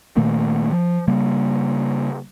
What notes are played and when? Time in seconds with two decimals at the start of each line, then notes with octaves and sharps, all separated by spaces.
0.17 A#2 D#3 A3 A#3
0.72 F3
1.08 C#3 G3 A#3